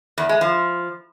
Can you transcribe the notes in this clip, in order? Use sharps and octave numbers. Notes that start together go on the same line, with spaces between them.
E2
G#3
F3